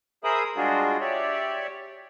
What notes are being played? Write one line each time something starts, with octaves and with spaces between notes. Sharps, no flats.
G#4 A#4 C5 E5 B5 D#6
G3 G#3 D4 F4 F#4 G#4
G4 C#5 D5 E5